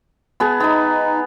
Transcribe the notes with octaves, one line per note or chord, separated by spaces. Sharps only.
B3 G#4 A5
B3 D#4 B5